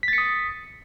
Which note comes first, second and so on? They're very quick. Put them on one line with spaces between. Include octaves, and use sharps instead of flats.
B6 A6 C#7 D#6